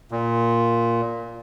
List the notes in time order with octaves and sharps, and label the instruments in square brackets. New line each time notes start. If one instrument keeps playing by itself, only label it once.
[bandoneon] A#2